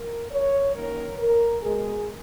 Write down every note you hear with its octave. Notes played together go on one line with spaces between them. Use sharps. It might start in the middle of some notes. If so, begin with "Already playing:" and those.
Already playing: A#4
C#5
F#2 D#3 A#3 A#4
A#4
B2 G#3 G#4